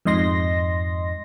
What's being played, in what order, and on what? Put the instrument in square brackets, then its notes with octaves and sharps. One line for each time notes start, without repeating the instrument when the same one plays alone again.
[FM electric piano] F2 G#2 D#5 C6 A#6